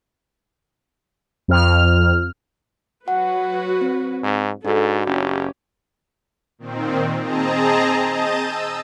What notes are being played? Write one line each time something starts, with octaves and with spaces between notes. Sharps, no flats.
F2 F6
F#3 F#4 B4 F#5
C4
G#2
G#2 D4 F#4 A4
F#1 C#4 G4
A#2 D#3 C4
C4 G#4 D#5 A5 A#5
D#5 A5 G6 A6 D#7
E6